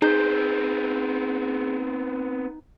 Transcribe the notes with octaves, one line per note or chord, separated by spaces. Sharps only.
B3 C4 D#4 G#4 G6